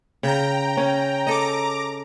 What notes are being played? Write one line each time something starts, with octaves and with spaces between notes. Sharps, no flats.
C#3 G5 A#5
C#4
A4 D#5 A#5 D6